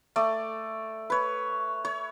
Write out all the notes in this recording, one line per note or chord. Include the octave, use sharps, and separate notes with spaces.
A3 D5
B4 C#5
C#5